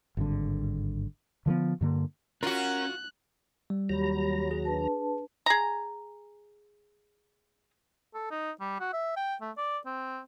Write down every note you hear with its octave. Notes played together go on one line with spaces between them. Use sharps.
G#1 G2 D3
D3 F3 G#3 B3
G2 D3 A#3
C#4 F4 F#4 A#4 F#5 F#6
G3
D#2 F#3 G4 C#5 A#5 B5
F#4 G#4
D4 B4 A5
G#4 A#5
A4
D#4
G3
F#4
E5
G5
A3
D5
C4